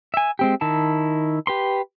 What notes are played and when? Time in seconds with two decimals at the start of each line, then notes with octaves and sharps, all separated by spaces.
0.14 E5 G#5
0.39 G#3 C4 G4
0.61 D#3 E4 A5
1.47 G4 B4 C6